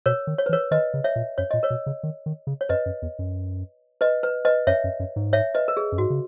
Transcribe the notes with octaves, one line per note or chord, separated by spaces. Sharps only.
B2 A#4 C#5
D#3
C#5
B4
E3
A#4 C#5
D#3 B4 D#5
C#3
C#5 E5
A#2
F#2 C#5
A#2 D#5
A#4 C#5
B2
C#3
D#3
D#3
C#3
C#5
F#2 B4 D#5
F#2
E2
F#2
B4 D#5
B4
B4 D#5
F#2 C#5 E5
F#2
F#2
G#2
C#5 E5
B4 D#5
A#4
G#4
F#2
G#2 F#4
C#3